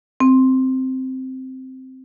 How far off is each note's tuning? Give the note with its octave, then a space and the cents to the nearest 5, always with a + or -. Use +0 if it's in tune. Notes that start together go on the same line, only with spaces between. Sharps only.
C4 -5